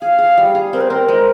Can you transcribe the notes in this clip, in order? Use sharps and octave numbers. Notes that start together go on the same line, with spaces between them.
G#4 F5
G#4
G3
G#4
C4 A#4
C5
C4 A#4
G#3